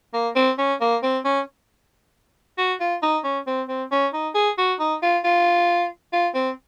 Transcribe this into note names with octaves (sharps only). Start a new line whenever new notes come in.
A#3
C4
C#4
A#3
C4
C#4
F#4
F4
D#4
C#4
C4
C4
C#4
D#4
G#4
F#4
D#4
F4
F4
F4
C4